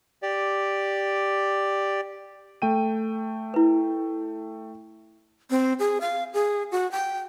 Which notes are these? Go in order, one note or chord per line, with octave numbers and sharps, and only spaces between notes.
G4 D5
A3 G5 D#7
E4 B4
C4
G#4
F5
G#4
F#4
G5